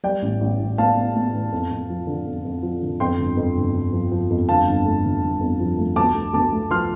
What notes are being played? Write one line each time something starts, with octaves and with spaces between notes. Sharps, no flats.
G3 D5 G5
A1
A1
A1
A2 F5 A5
A2
A2
A1
F2
F2
F3
D3
F2
F2
F3
D3
F2 G5 C6
G1
F2
G1
G1
F3
F3
F2
G1 F5 A5
G1
A3
G1
G1
F2
F3
A3
D2 A5 D6
A3
D2 A5 D6
A3
F3 C6 F6